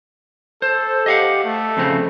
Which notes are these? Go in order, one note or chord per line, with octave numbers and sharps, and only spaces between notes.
A4 C5
G4 D#5 F5 F#5
A3
F2 C#3 C4